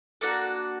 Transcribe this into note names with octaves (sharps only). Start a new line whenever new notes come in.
A#3 D4 F#4 A4